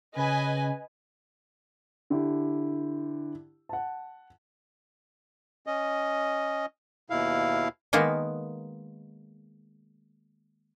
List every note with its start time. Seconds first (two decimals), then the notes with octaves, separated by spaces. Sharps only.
0.16 C#3 B4 D#5 G#5
2.10 D3 E4 G4
3.69 F#5 A5
5.67 C#4 D#5
7.10 D#2 B2 E4 F5
7.93 D#3 G#3 A#3 B3